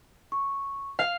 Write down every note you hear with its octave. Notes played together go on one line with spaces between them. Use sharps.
C#6
F5